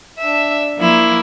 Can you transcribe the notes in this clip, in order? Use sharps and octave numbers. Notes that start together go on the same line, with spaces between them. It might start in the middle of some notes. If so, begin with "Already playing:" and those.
D4 E5
F3 A#3 E4